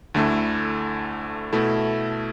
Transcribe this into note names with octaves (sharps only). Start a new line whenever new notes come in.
D2 D3 A3 E4 A4
B2 A3 E4 A4